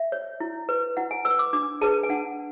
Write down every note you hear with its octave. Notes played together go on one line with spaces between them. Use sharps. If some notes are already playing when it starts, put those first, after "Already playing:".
Already playing: E5
C#5
E4
B4
E4 F#5
G#5
B4 E6
D6
D4 D6
G#4 B4 A5
G#5
D4 F#5